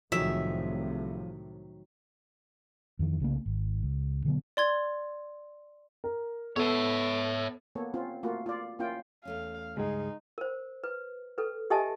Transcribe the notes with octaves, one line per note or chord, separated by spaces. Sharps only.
C2 A2 C3 D#3 F3 F#3 G#4 E5
F2 D#3 E3
C2 C#3 A3 A#3
G#1
C#2
B2 D3 F#3 B3
D5 C6 G#6
A#4
B3 A4 C#5 E5
A#3 B3 A4 C#5
C4 C#4 F4
A3 A#3 F4 F#4
F4 D5
A#3 C#4 E4 F4 G5
E2 A3 C#4 F5
C#2 G2 G#3 D#4 G#4
A#4 C5
B4
A4 B4
G4 A4 D#5 E5 G#5 A5